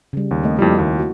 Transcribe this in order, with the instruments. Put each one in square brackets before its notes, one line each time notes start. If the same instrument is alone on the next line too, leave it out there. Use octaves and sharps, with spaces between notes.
[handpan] C#3 G3
[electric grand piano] D#2
[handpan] A3 C4 D#5
[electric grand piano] F2 G3 [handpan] A#3 E4 F#4
[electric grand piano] D#2 [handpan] F#4
[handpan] F#4